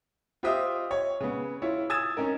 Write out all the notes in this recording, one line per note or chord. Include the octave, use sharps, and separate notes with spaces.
F4 G4 C5 D#5 E5 D#6
C#5
C#3 B3
E4 F4 C#5
D#6 E6 G#6 A6 E7
C#4 D#4 A#4